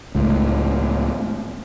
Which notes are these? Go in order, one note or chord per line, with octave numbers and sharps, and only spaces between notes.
C#2 A2